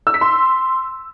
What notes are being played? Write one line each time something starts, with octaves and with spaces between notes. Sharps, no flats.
E6
B6
C6